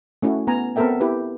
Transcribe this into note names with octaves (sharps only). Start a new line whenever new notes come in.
A3 C#4 E4 F#4
B3 G#5 A#5
B3 C4 A4 A#4 E5 G5
E4 G4 B4